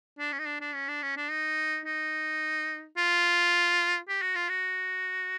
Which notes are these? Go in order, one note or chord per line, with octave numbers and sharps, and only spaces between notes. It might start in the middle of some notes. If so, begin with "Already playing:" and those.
D4
C#4
D#4
D4
D4
C#4
D4
C#4
D4
D#4
D#4
F4
G4
F#4
F4
F#4